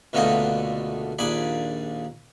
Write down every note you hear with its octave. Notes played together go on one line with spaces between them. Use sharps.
C#2 B2 D3 A3 A#3 D#5
A#1 D#2 G#4 D5 B5